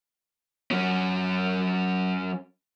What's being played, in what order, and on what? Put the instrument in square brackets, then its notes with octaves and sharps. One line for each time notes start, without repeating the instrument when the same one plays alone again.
[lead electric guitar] F#3 C#4